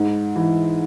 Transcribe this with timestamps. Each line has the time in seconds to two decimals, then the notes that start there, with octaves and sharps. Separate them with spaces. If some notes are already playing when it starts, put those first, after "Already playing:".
Already playing: G#2
0.36 E3